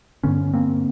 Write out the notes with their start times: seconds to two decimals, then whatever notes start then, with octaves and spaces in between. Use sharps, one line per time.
0.23 G2 D3 B3 C#4
0.53 A#3 C4